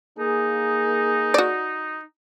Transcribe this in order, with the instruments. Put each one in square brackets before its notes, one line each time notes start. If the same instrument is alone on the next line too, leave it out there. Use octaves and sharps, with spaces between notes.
[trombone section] A#3 G#4 [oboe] D#4
[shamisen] F#4 D5